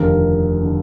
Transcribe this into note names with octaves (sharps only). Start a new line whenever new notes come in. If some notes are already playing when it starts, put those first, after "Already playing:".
Already playing: F1 D#2 D3 A#4
D3